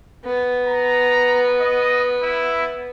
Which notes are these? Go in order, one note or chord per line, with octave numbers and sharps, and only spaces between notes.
B3
A#5
D#5
E4